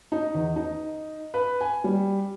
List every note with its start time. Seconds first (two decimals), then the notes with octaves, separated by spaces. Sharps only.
0.12 D#4
0.35 E2
0.56 D#4
1.34 B4
1.61 G#5
1.84 G3